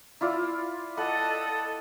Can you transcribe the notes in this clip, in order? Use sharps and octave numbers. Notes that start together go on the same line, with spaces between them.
E4 F4 D5
A4 D#5 F#5 B5